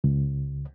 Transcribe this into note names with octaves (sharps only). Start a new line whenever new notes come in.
C#2